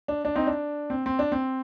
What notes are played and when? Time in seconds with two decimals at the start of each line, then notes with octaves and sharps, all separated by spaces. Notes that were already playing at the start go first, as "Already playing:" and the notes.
0.08 D4
0.25 D4
0.35 C4 D#4
0.47 D4
0.90 C4
1.06 C4
1.19 D4
1.32 C4